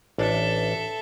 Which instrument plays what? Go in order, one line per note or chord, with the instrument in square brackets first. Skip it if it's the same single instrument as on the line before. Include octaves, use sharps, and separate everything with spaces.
[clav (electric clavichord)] A1 D4 [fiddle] A4 E5